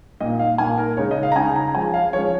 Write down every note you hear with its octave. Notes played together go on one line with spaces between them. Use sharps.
A#2 A#3 D#4 D#5
F5
A#2 A#3 D#4 G#5
A#4
C#3 G#3 D#4 C#5
D#5
F5
A#5
C#3 G#3 D#4 G#5
A#5
F3 G#3 C#4 G#5
F5
F3 G#3 C#4 C#5